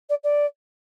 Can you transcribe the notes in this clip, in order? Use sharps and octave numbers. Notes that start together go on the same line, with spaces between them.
D5
D5